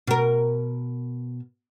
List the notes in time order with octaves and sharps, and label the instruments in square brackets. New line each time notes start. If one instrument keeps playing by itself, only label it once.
[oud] B2 A#4